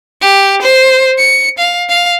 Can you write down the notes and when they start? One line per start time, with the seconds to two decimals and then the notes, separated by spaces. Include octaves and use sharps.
0.22 G4
0.62 C5
1.19 C#7
1.58 F5
1.89 F5